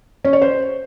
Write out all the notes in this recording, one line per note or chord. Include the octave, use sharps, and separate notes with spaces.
C#4
C#5
C5